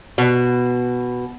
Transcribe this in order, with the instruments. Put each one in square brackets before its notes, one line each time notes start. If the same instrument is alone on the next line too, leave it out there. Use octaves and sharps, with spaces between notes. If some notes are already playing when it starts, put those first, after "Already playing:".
[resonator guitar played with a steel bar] B2